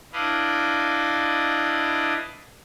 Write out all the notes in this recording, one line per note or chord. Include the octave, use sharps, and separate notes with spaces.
D4 E4 B4 D5 D#5 F5